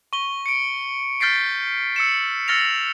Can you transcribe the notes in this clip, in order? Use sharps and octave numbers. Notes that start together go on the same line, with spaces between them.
C#6 G7
C#7 D7
F6 G6 A6 B6 C7 D7
E6 C#7 E7
E6 F6 A6 A#6 C#7 F7